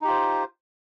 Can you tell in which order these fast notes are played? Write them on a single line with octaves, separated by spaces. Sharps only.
D#4 G4 F4 C5